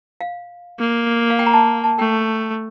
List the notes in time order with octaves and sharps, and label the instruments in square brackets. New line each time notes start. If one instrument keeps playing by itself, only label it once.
[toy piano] F5
[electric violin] A#3
[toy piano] F5
G5
A#5
A5
A5
[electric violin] A3 [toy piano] G5